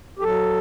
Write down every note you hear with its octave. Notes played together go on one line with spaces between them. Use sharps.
G4
F#3 A4